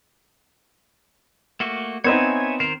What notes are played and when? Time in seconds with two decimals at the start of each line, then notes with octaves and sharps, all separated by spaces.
1.60 A3 A#3 F#4
2.04 B3 C4 D#4 C#5 E5 G#5
2.60 D#3 A#4 C5